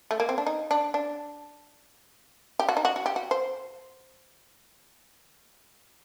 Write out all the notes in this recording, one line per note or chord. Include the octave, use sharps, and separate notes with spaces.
A3
A#3
C4
D4
D#4
D4
D4
G4
F#4
D#4
F#4
F#4
G4
F#4
C5